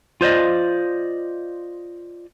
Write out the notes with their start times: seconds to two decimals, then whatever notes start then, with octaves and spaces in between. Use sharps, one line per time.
0.21 F4 C5 D5 D#5